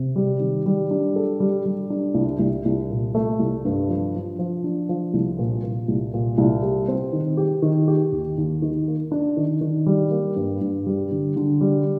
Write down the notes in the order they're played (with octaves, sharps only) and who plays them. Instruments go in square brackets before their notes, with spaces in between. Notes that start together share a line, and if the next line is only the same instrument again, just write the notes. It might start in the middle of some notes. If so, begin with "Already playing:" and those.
Already playing: [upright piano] C3
G3
D#3
G3
D4
A4
G3
G3
D4
C2
C2
C2
A#2
A3
C2
G2
F3
F3
F3
D4
F3
C2
A#2
A#2
C2
A#2
C2
G4
C4
D#3
G4
D#3
G4
D#2
D#2
D#3
A#3
D4
D#3
D#3
G3
A#3
G2
G2
G3
D3
D3
G3